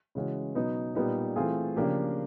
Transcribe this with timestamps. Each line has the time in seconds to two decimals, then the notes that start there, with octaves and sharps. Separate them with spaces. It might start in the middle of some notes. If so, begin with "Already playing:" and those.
0.15 C#3 E3 G#3 C#4 F#4
0.55 B2 F#3 B3 D#4
0.95 A#2 G3 B3 D#4
1.36 E3 A3 C4 F4 G#4
1.76 C#3 F3 A#3 D4 G4